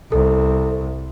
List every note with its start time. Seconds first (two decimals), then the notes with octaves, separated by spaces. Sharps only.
0.12 C2 A4